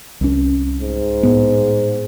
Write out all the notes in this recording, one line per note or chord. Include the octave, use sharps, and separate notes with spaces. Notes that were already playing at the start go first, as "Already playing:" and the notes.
C2 C#4
G#2
A2 B3